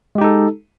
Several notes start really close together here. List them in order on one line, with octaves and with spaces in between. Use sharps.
G#3 G4 D#4 A4